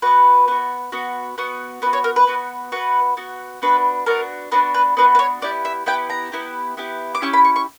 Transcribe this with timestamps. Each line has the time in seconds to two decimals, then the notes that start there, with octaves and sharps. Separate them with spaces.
0.02 B3 F#4 B4
0.48 B3 F#4
0.92 B3 F#4
1.38 B3 F#4
1.82 B3 B4
1.86 F#4
1.93 C#5
2.04 A#4
2.16 B4
2.27 B3 F#4
2.72 B3 F#4 B4
3.17 B3 F#4
3.62 B3 D4 F#4 B4
4.06 B3 D4 F#4 A#4
4.52 B3 D4 F#4 B4
4.74 B4
4.97 B3 D4 F#4 B4
5.15 B4
5.19 C#5
5.42 B3 E4 G4 D5
5.65 E5
5.86 B3 E4 G4 G5
6.10 A#5
6.32 B3 E4 G4
6.77 B3 E4 G4
7.15 D6
7.22 C#4 E4 G4 C#6
7.33 B5
7.45 C#6
7.56 C#6